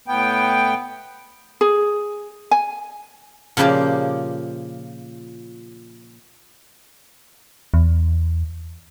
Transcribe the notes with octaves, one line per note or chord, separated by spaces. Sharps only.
A2 B3 G5
G#4
G#5
A#2 C#3 F3 A#3 G4 D5
E2